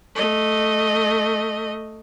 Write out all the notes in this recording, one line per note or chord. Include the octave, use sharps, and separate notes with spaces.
A3 D#5